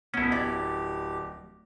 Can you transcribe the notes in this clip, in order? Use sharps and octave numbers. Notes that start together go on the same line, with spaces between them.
D1 B3 C#4 E4 A#6
G4 D5 E5